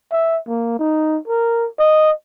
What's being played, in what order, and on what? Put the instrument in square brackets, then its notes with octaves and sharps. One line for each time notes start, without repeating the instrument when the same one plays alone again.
[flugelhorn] E5
A#3
D#4
A#4
D#5